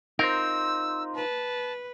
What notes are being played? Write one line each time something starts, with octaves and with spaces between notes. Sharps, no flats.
C4 D#4 F4 A#4 C5 E6
B4 A5